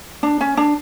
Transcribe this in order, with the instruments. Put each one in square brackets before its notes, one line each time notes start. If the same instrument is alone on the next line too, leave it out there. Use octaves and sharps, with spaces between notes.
[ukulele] D4
C#4
D4